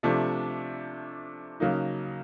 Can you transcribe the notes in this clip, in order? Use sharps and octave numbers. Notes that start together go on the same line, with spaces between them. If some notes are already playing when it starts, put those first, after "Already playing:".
C3 F3 A3 D4
C#3 F#3 A#3 D#4